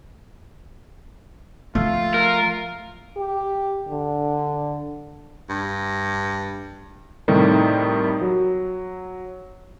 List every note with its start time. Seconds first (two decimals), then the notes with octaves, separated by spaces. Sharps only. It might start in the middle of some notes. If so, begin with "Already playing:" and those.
1.75 F3 A3 F4
2.14 A#4
3.17 G4
3.88 D3
5.49 G2
7.28 A2 C3 D#3 G3
8.21 F#3